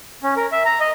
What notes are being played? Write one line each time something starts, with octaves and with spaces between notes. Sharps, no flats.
C#4
A#4
E5
A#5
D#5